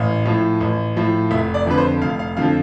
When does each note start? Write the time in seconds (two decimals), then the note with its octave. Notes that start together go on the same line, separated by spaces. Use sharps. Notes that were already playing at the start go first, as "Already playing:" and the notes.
Already playing: A1 F5
0.25 A2 F3
0.61 A1
0.96 A2 F3
1.31 F1 E5
1.54 D5
1.66 F2 D3 F3 B4
1.78 C5
2.02 F1 F5
2.19 F5
2.37 F2 D3 F3 F5